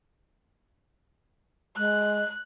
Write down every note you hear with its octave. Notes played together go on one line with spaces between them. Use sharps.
G#3 F#6